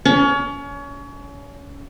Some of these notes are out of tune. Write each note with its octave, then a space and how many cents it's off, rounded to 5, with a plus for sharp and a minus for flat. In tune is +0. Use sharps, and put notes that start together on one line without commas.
C#4 +30